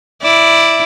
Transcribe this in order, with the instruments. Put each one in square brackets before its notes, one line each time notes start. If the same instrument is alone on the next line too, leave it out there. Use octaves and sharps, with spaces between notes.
[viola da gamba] E4 D5